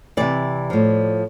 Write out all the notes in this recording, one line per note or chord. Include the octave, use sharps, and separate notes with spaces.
C3 E3 D5
A2 F3